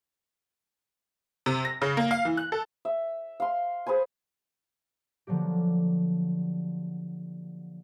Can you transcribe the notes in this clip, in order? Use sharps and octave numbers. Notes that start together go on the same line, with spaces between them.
C3
A#6
C#3
A#3
F5
E3
F#6
A4
E5
F5 C6
G#4 B4 C5 G#5
D3 F3 F#3 A#3 G4